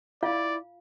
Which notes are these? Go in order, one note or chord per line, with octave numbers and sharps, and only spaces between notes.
E4 F4 D5 F5